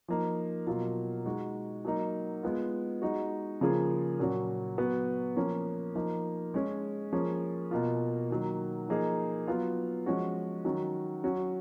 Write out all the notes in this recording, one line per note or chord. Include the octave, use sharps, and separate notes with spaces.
F3 A#3 D#4
B2 F#3 A#3 F4
G#3 D#4 F#4
F#3 A#3 D#4
G#3 B3 F4
G#3 D#4 F#4
C#3 F3 A#3 F4 G#4
A#2 F#3 C#4 F#4
F#3 B3 F#4
F3 A#3 C#4
F3 A#3 D#4
G#3 C#4 G#4
F3 A#3 C#4 G#4
B2 A#3 F4
D#3 F#3 A#3
F3 A#3 D#4 G#4
F#3 B3 F4
F3 G#3 C#4 F#4
D#3 F#3 C#4 F#4
F#3 C#4 F#4